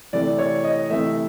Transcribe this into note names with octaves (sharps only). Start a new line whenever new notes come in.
C3 E3 A3 D5
C#5
D#5
C3 E3 A3 E5